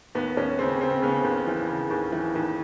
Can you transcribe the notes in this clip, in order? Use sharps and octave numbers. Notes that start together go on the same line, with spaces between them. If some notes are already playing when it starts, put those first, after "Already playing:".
D#2 B3
D#2 C#4
C#3 C4
C#3 C4
C#3 B3
D#2
E3
C#3
D#2
E3
D#2